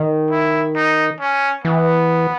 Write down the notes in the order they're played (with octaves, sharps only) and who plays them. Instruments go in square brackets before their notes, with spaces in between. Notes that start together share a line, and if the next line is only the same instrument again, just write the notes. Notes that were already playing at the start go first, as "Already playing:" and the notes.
Already playing: [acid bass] D#3
[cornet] E4
D#4
C#4
[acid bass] E3 [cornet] B3